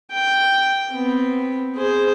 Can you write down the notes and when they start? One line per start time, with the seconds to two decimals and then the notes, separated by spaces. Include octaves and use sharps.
0.12 G5
0.93 B3 C4
1.75 G#4 C5